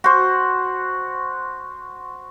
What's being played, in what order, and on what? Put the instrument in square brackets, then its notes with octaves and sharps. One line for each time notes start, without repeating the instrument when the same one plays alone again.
[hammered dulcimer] F#4 C5